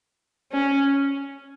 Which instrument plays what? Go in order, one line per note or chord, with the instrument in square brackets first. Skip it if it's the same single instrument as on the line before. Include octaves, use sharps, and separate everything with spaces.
[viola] C#4